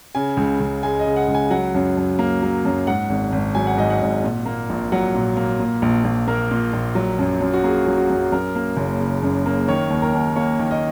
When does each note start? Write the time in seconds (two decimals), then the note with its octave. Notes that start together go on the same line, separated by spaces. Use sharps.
0.15 C#3 G#5
0.37 C#2
0.60 C#2
0.83 G#3 G#5
0.99 D#5
1.06 C#3
1.16 F#5
1.28 C#2
1.35 G#5
1.50 F#3 F#5
1.74 F#2
1.97 F#2
2.19 A#3
2.42 F#3
2.65 F#2
2.87 G#2 F#5
3.09 G#1
3.32 G#1
3.55 F#3 G#5
3.67 F#5
3.77 G#2 D#5
3.90 F#5
4.01 G#1
4.24 A#2
4.45 A#3
4.69 A#1
4.92 F#3 F#5
5.15 A#2
5.37 A#3
5.59 A#2
5.82 A#1
6.04 A#1
6.28 A#3 A#4
6.51 A#2
6.73 A#1
6.95 F#3
7.19 F#2
7.41 F#2
7.54 F#4
7.63 A#3 G#4
7.87 F#3
7.98 F#4
8.10 F#2
8.32 F#2 A#4
8.55 A#3
8.77 F#1
9.00 C#3
9.23 F#2
9.46 A#3
9.68 D#3 C#5
9.90 D#2
10.02 A#4
10.14 D#2
10.36 A#3 C#5
10.59 D#3
10.71 D#5